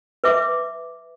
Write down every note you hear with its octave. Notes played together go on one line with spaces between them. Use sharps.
B4 E5 D6